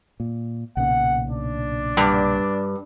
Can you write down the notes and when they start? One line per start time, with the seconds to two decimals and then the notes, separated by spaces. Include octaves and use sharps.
0.20 A#2
0.77 B1 A#2 C#3 F#5
1.30 D4
1.97 G2